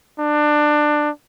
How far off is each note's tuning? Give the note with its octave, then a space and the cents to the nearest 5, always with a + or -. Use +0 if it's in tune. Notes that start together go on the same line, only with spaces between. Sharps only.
D4 +20